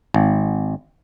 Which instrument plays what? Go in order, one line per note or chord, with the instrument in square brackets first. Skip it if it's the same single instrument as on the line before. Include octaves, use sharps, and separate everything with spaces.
[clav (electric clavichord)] G#1